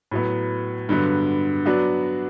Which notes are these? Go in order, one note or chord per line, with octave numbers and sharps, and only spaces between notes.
A2 F#3 B3
G2 D3 F#3 B3
F#3 B3 D4 F#4